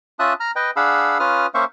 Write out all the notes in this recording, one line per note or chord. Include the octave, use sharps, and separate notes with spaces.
C#4 F4 E5 A5 D#6 F#6
A#5 F6
B4 D#5 G5
D4 G#4 F5 F#5 B5 E6
C#4 F4 B4 D#6 F6
A#3 C#4 C5 E5 F5 C#6